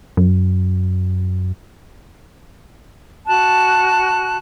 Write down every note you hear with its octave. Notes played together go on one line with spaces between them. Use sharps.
F#2
F#4 A5 F#6